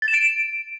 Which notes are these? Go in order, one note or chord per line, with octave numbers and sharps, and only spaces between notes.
A6
E7
D7